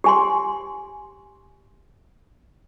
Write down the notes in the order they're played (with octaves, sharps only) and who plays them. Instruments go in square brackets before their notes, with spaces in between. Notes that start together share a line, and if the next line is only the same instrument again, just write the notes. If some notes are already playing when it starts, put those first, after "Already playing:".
[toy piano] G4 G#5 C6